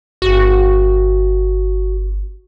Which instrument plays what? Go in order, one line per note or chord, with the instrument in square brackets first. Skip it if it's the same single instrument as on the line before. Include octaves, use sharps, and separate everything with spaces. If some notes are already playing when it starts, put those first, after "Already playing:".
[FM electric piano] G1 [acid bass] F#4